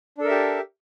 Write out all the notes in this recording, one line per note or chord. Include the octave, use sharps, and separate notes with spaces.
D4 G4 A4 A#4 E5